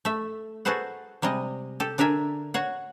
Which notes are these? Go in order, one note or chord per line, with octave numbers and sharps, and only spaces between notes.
A3 E5
F#4 G#4 A4 B4 C5 F#5
C3 G3 G#3 D#5
G4 A4
D3 D4 A#4 E5 G#5
F#4 C#5 F#5